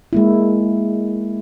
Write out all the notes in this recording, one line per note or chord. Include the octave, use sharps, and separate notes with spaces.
G#3 A#3 E4